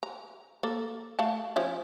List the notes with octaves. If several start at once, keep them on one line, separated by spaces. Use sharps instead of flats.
A#5
A#3 A4
A3 F5 A5
F3 C#4 E4